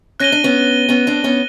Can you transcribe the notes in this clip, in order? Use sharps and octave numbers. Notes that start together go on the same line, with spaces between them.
C#4 F#6 A#6 D#7 G7
D4
B3 C#4
B3 C#4
C4 D4
B3 C#4